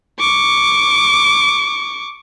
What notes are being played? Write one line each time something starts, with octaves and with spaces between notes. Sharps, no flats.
C#6 D6